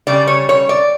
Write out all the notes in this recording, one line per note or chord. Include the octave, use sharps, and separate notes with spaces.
C#3 G3 D5
C#5
C#5
D5